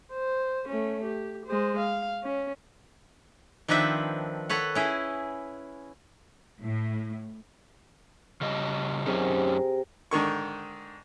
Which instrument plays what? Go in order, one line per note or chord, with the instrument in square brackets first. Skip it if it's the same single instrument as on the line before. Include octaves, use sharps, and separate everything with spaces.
[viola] C5
A3 C#4
G4
G#3 C5
F5
C#4
[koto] D#3 F3 C4 D4 B4 E5
A4 B4 C#5 F#5
C#4 E4 G#4
[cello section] A2
[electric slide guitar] C#3 G3 D#5
[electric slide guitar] F#2 C#4 D#4 [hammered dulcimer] C3 G#4 A#4
[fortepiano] G#2 D3 D#3 C#6